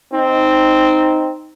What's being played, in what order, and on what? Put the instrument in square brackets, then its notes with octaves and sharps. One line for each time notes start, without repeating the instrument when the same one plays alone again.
[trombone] C4 [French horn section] D#4